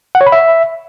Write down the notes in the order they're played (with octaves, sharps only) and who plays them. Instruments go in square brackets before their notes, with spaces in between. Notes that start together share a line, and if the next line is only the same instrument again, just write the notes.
[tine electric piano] F#5
C#5
B5
E5